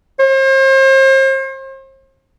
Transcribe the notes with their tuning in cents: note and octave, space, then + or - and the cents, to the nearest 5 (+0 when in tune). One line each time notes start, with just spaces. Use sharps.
C5 +40